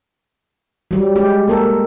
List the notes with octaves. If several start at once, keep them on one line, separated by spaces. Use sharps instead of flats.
F#3 G3
G#3 G4
A#3 A4 A#4